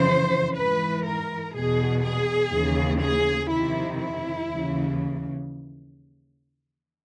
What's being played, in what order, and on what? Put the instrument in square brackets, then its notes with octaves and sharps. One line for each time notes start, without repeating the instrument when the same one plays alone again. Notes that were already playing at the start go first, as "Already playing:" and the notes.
Already playing: [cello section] F2 C#3 E3 C5
G#2 E3 B4
A#4
E2 B2 G#4
G#4
D#2 C#3 E3
G#4
F2 C3 D#3 E4
E4
D#2 C#3 E3